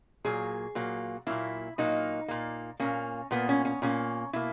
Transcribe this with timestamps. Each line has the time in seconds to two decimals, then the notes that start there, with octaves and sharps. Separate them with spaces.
0.24 A#2 F#3 A#3 G#4
0.75 A#2 F#3 A#3
1.27 A#2 F#3 A#3 E4
1.78 A#2 F#3 A#3 D#4
2.28 A#2 A#3
2.80 A#2 A#3 C#4
3.31 A#2 A#3 B3
3.49 C#4
3.65 C#4
3.82 A#2 A#3 C#4
4.33 B2 A#3 E4